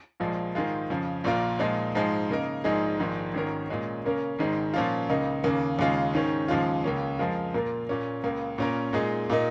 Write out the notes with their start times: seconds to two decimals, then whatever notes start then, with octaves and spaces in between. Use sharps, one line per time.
0.20 A#1 A#2 F3 G#3
0.55 G#2 D#3 G#3 F4
0.90 F2 C#3 F3
1.24 A#1 A#2 A#3 F4 A#4
1.59 A#2 F3 G#3 D#4
1.95 G#2 F3 G#3
2.29 C#3 A#3 D#4 A#4
2.64 A#1 G#2 G#3 D#4 G#4
2.99 A#1 G#2 D#3 G#3
3.34 G#1 G#2 D#3 C#4 A#4
3.69 A#2 G#3 C#4
4.05 C#3 A#3 C#4 A#4
4.39 G#1 G#2 D#3 G#3
4.74 A#2 F3 C#4 F4
5.09 C#2 C#3 A#3 D#4
5.44 D#2 C#3 A#3
5.79 D#2 C#3 G#3 F4
6.14 G#2 D#3 C#4
6.48 D#2 C#3 F3 G#3 F4
6.84 C#2 C#3 A#3 C#4
7.19 F2 F3 G#3 F4 A#4
7.54 A#2 A#3 F4 A#4
7.89 A#2 A#3 C#4
8.23 C#2 C#3 A#3
8.58 A#2 A#3 C#4 A#4
8.93 A#2 G#3 D#4 G#4
9.30 A#2 A#3 D#4